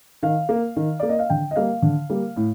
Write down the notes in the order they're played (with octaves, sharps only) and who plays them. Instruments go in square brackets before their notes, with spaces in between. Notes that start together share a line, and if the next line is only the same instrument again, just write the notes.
[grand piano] D#3 F5
A#3
D#3
A#3 D5
D#5
F5
D3 G5
D#5
G3 A#3 F5
D3
G3 A#3
A2